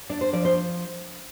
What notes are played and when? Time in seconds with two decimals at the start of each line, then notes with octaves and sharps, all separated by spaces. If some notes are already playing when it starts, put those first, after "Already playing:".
0.10 D4 D5
0.21 C5
0.33 F3 D5
0.45 C5